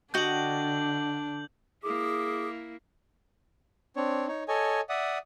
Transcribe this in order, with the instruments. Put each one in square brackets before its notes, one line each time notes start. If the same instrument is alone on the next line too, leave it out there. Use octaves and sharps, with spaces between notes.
[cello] D3 [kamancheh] D4 [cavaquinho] F#4 D#5 G5 [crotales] G6 F#7
[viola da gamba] A#3 E4 [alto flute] G#4 [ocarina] D6
[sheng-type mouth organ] C4 D4 C#5
D#4 C#5
A4 C#5 D#5 G#5
D5 E5 F#5 D#6